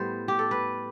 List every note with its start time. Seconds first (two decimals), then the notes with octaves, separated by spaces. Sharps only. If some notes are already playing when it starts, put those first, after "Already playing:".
Already playing: A2 G3 B3 C5
0.28 G4
0.39 A4
0.51 B4